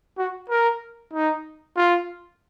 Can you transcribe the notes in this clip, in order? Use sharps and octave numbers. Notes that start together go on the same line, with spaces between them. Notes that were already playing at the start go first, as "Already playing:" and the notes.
F#4
A#4
D#4
F4